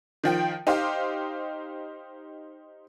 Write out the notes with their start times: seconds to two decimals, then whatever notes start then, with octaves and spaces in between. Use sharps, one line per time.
0.24 D#3 F3 G5
0.67 D#4 G4 C5 F5